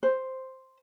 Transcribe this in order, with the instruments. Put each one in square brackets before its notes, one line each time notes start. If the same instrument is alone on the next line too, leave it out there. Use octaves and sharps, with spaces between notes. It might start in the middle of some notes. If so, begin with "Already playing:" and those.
[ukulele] C5